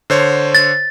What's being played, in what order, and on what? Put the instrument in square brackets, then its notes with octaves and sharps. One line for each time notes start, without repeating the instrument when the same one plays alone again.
[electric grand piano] D3 C5 C#5
[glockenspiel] A6